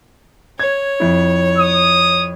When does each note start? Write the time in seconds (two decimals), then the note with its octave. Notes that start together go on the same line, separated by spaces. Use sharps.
0.59 C#5 G#6
1.00 F2 E4
1.58 D#6